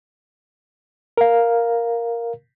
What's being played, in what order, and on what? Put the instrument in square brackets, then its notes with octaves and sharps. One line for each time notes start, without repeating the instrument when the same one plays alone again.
[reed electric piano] A#4 F5